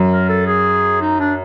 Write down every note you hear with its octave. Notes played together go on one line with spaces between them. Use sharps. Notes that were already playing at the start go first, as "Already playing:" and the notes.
Already playing: F#2
A#4
A4
G#4
D#4
D4